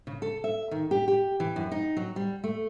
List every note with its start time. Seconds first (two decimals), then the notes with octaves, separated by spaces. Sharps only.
0.07 C#3
0.22 A4
0.44 E5
0.71 D#3
0.91 G4
1.08 G4
1.40 E3
1.56 F#2
1.72 D#4
1.97 F#3
2.16 G3
2.44 A3